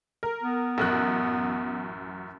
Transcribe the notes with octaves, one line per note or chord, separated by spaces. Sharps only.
A#4
B3
A1 F#2 F#6